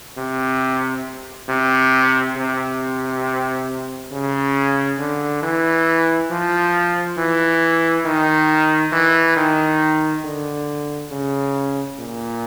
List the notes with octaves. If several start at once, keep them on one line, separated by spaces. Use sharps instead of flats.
C3
C3
C3
C#3
D3
E3
F3
E3
D#3
E3
D#3
D3
C#3
A#2